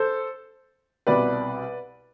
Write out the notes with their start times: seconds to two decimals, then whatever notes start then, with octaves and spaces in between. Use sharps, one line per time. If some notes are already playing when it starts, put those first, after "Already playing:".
Already playing: A4 C5
1.07 C2 B2 B4 D5